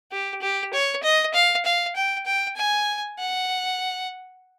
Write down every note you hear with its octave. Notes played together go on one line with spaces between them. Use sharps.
G4
G4
C#5
D#5
F5
F5
G5
G5
G#5
F#5